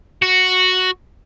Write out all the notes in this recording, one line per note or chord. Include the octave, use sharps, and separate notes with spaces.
F#4